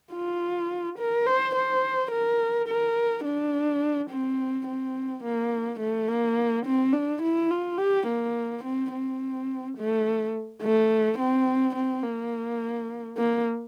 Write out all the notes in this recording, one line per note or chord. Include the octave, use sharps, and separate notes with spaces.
F4
A#4
C5
C5
A#4
A#4
D4
C4
C4
A#3
A3
A#3
C4
D4
E4
F4
G4
A#3
C4
C4
A3
A3
C4
C4
A#3
A#3